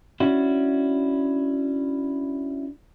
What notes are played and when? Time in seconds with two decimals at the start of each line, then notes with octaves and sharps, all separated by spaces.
0.20 C#4 D4 E4 F#4